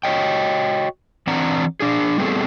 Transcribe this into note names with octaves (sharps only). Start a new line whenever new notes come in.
F#4 C#5 D#5 G5
E3 C4 D4 F#5 A#5
D4 G#4
G3 B3 C4 G#4 A4